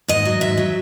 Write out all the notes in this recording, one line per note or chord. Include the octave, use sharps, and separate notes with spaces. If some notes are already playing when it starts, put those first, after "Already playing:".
G#2 D#5
F#3
G#2 E5
F#3